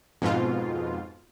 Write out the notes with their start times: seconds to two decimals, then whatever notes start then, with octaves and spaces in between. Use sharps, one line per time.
0.22 F2 G#2 B2 F4